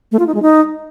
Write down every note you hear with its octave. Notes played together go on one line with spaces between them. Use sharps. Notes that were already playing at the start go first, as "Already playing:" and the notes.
A3
F4
D#4
G#3
D#4